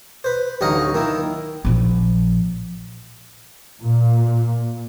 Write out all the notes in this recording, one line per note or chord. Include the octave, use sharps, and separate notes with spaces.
B4 C5
A1 D2 F#3 D#4 D#5 F5
D#3 A#3 E4
A#1 F3
A#2